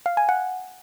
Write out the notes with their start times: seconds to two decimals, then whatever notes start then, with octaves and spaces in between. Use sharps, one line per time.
0.06 F5
0.17 G#5
0.29 F#5